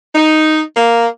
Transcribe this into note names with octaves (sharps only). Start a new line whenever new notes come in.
D#4
A#3